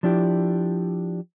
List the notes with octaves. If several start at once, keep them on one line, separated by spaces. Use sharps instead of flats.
F3 D4 E4 G4